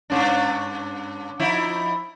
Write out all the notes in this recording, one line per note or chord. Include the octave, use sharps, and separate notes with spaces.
G2 C#4 D4
F3 D#4 E4